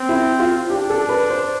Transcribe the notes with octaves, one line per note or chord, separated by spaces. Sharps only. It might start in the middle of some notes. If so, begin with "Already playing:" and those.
Already playing: C4
E4
F4
D4 G4
A4
B4
C5